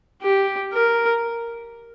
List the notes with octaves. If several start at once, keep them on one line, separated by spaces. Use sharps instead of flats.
G4
A#4